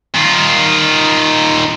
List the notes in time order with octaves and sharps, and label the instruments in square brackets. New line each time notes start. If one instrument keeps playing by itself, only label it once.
[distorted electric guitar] D#3 F4